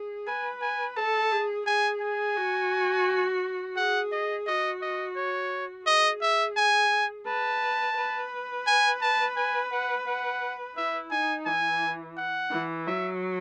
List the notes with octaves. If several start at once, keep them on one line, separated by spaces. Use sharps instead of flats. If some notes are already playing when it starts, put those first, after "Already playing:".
Already playing: G#4
B4 G#5
G#5
A4 A5
G#4
G#4 G#5
G#5
F#4
G#4 F#5
D#5
F#4 D#5
D#5
C#5
G#4 D#5
E5
G#5
B4 A5
B4
G#5
A5
G#5
F#5
F#5
E4 E5
D#4 G#5
E3 G#5
F#5
E3
F#3 E5